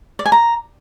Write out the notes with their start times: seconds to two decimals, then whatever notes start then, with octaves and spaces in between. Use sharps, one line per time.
0.19 D5
0.26 G#5
0.32 A#5